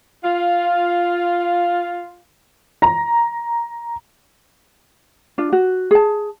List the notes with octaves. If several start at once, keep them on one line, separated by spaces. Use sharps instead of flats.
F4 F5
A#5
D4 F4
F#4
G#4 A5